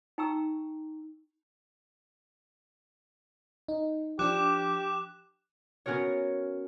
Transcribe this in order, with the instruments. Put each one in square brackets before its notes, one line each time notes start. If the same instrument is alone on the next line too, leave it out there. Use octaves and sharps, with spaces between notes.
[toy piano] D#4 G5 A#5 C#6 E6
[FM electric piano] D#4
[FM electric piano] F3 D4 [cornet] G4 [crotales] D6 F#6 E7
[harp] B3 C#4 F#4 A#4 C#5